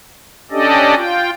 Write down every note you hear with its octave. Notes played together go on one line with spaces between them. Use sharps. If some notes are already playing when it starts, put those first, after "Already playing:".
C#4 D4 G4 A4 D5 D#5
F4 G5